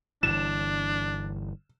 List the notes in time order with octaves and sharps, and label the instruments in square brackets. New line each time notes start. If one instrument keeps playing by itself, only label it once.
[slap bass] G1 E3 [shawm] D4 [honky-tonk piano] E7